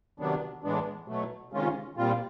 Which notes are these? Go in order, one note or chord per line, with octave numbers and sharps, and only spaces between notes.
C3 D#3 F#3 B3 D4
A2 E3 G#3 B3 D4
B2 F#3 A3
C3 D#3 G#3 C#4 F4
A#2 G3 C4 F4